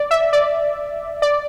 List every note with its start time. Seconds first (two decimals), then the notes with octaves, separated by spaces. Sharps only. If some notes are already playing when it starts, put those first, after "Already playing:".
Already playing: D5
0.11 E5
0.33 D5
1.22 D5